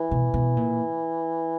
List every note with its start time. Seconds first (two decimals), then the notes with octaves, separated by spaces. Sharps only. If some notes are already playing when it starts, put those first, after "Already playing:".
Already playing: E3
0.11 B2
0.34 B2
0.57 A#2